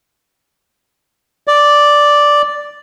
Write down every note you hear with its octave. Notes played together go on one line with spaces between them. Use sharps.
D5